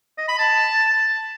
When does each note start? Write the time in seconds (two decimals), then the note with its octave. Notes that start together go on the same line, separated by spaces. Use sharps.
0.18 D#5
0.28 B5
0.39 A5